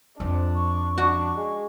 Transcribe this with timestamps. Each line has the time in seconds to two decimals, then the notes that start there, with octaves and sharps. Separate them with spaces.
0.20 F2 F3 D4
0.55 C#6
0.98 D4 F#4
1.36 G#3